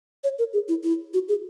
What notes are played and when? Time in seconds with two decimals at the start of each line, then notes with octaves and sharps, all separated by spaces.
0.24 C#5
0.38 A#4
0.53 G#4
0.68 E4
0.83 E4
1.13 F#4
1.28 G#4